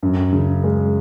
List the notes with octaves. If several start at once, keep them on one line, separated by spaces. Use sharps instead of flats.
F#2
C#3
G#3